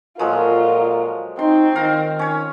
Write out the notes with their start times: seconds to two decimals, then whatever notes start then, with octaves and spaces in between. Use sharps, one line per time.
0.19 A#2 F3 F#3 G#3 F4 A4 A#4
1.39 C4 D#4 C6
1.76 D#3 F5 A#5
2.19 C#4 C#5